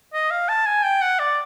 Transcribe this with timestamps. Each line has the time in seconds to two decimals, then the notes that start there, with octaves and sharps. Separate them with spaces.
0.14 D#5
0.30 F5
0.49 A5
0.66 G#5
0.84 G5
1.02 F#5
1.19 D5